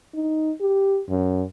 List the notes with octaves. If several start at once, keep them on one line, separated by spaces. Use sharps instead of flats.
D#4
G4
F#2